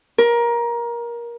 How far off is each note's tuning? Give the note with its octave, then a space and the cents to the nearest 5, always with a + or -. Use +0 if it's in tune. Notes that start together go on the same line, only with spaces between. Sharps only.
A#4 +20